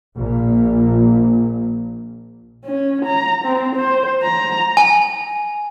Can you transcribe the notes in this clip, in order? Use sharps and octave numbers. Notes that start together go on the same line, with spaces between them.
A#1 A#2
C#4
A#5
C4
C5
A#5
G#5